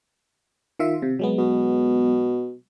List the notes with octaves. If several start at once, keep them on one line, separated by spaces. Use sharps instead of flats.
D#3 F4 E5
C3
F#3 G#3 B3
B2